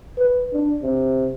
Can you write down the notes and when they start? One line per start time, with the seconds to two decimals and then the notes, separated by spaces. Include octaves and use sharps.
0.18 B4
0.53 D4
0.82 C3